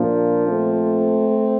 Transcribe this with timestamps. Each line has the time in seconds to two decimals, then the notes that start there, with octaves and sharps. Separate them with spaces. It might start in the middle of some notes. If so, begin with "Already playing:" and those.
Already playing: A#2 F3 A#3 D4
0.48 A3 C4